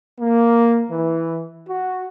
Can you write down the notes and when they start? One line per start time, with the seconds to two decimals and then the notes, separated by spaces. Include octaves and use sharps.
0.20 A#3
0.90 E3
1.69 F#4